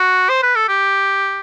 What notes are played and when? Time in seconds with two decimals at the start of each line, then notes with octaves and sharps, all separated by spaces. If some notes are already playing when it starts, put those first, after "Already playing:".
Already playing: F#4
0.30 C5
0.43 B4
0.56 A4
0.69 G4